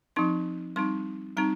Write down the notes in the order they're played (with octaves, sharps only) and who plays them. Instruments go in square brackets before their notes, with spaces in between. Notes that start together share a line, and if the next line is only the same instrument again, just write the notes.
[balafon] F3 C4 D#4 C6
G3 C4 D#4 C6
G3 C4 D#4 A#5